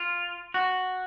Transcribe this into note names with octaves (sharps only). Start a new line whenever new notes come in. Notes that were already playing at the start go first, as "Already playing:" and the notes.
Already playing: F4
F#4